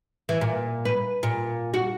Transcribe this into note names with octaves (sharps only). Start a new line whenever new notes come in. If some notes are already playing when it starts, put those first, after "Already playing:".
E3
A#2
B4
A#2
F#4